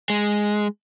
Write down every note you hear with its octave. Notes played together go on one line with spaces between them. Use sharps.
G#3